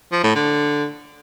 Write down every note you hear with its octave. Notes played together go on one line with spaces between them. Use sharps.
F3
A2
D3